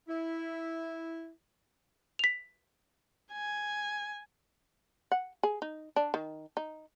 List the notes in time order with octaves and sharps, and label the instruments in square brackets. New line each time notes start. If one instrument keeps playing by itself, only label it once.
[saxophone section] E4
[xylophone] B6 F7
[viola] G#5
[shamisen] F#5
G#4
D#4
D4
D#3
D#4